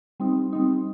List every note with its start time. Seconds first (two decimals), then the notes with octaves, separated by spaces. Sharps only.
0.20 G3 C4 D#4
0.53 G3 C4 D#4